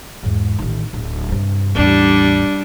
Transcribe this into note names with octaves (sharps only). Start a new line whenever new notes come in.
E2 G#2
A1 D#3
D1
G2 C3
A1 E2 G3 D4